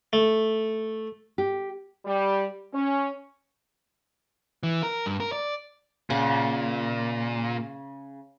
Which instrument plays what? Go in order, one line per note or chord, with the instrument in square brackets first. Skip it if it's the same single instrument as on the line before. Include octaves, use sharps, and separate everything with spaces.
[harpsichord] A3
[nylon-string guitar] G4
[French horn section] G3
C#4
[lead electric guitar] E3
A#4
G2
A#4
D5
[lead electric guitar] A#2 [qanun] C#3 F#5